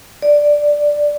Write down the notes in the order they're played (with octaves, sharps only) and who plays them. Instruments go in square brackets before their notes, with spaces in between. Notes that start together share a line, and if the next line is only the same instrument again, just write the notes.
[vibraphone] D5